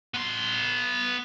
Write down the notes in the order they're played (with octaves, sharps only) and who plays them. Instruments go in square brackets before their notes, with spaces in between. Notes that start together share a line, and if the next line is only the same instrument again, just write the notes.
[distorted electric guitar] B3 C6